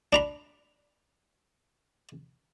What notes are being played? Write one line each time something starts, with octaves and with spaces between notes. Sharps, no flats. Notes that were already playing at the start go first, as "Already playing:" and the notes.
D4 A#5 B5